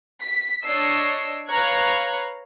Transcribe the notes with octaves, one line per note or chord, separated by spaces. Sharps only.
B6
D4 C#5 D#5 E6 C7
B4 C#5 F5 A#5 F#6 G#6